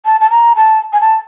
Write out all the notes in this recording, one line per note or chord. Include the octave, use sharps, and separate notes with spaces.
A5
A5
A#5
A5
G#5
A5